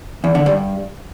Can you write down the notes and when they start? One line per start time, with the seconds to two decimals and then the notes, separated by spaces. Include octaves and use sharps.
0.24 E2
0.35 D3
0.46 G2